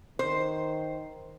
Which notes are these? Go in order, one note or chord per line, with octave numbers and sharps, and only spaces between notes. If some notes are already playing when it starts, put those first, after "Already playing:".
D#3 C5